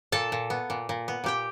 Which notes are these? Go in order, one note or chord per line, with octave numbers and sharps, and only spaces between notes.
A#2 A4 A5
A#2
B3
A#2
A#2
B3
A#2 G4 G5